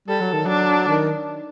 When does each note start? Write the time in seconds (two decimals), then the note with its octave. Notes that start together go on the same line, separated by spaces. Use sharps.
0.08 G3 A4
0.21 F#3
0.33 D#3
0.45 F#3 D4
0.88 D#3